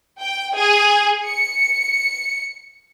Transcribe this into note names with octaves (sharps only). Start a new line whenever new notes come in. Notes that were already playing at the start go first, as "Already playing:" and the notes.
G5
G#4
C#7